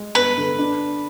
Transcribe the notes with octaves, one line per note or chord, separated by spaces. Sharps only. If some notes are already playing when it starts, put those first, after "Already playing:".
Already playing: G#3
G1 B4
D3
D4